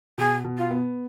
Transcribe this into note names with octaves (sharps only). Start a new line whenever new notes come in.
B2 G#4
B2
F4
B3